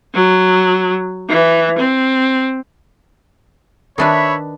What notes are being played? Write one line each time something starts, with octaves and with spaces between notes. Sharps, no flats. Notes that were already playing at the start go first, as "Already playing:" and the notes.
F#3
E3
C4
D#3 D4 B4 C#5 E5 B5